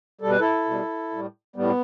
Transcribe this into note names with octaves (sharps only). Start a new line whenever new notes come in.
B2 G3 A4
B4
E4 A4
B2 G3
A2 G3
A2 G3 B3